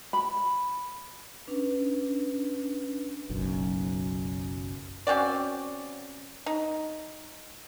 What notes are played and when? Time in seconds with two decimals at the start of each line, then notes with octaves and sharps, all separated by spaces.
0.13 B5
1.47 C#4 D4 B4
3.30 F#1 B1 F#2
5.07 C4 C#4 F#4 D5
6.46 D#4